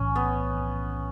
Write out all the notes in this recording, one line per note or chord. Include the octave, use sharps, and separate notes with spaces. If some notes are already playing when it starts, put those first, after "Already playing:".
Already playing: B1 A2 E3 C#4
B3